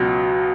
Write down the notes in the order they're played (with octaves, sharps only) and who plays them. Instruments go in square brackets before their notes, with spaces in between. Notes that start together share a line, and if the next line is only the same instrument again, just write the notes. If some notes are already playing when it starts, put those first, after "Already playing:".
Already playing: [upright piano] C#2 B2 F#3